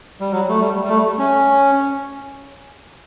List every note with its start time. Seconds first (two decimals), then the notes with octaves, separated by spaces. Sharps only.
0.20 G3
0.32 F#3
0.49 A3
0.61 G3
0.84 G3
0.89 A3
1.19 C#4